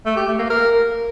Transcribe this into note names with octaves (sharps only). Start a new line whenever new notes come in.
A3
G4
A3
A#3
A#4